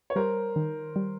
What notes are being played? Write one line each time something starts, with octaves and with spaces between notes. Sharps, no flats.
C#5
G3 A#4 C5
D#3
G3